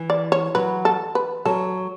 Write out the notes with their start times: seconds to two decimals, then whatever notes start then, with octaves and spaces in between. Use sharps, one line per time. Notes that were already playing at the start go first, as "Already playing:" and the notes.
Already playing: E3
0.10 D5
0.32 C#5
0.55 F#3 B4
0.85 A4
1.15 B4
1.45 F#3 A4